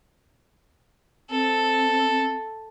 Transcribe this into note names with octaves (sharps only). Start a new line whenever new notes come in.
C4 A4